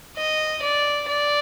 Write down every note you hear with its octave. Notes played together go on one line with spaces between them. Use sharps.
D#5
D5
D5